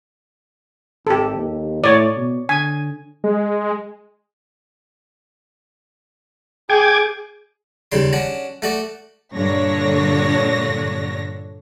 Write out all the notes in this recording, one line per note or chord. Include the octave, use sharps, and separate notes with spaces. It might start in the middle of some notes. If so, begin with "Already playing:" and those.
G#1 G4 A4
D#2
A2 C#5 D5
B2
D3 G#5
G#3
G#4 G5 D6 G#6
D#2 C#3 G3 C6
C#4 D4 F#4
A3 F#4 D5
G2 A#2 D3 D4 C#5 A#6